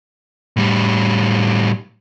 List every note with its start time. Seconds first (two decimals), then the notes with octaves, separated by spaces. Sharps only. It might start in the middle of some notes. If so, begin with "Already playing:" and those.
0.57 A2 G3